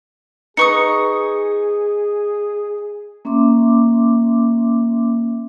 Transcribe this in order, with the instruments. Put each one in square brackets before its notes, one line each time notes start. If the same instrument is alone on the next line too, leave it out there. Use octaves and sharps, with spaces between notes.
[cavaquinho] D#4 C#6 D#6 [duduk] G#4 [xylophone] B4 C#7
[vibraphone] A#3 C#4 E5 C6 D6